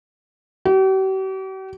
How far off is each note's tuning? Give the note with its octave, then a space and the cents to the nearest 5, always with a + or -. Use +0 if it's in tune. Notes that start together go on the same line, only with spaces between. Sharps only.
G4 -45